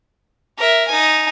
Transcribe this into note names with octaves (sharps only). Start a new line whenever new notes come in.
A#4 E5
D#4 G#5